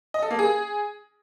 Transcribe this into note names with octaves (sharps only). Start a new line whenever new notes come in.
D#5
A4
A#3
G#4